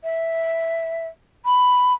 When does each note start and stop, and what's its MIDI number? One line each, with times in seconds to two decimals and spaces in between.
0.03 1.07 76
1.45 1.92 83